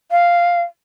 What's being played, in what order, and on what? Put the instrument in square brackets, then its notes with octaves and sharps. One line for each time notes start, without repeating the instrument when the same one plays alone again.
[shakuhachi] F5